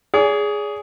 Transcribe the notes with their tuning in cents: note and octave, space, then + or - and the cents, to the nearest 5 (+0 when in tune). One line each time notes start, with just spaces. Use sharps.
G#4 +0 D5 -45